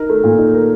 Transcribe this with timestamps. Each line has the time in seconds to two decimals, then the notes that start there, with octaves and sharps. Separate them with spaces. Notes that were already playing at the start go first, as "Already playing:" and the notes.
Already playing: D#4 A#4
0.10 A3
0.24 A#2
0.38 D#4
0.54 A#4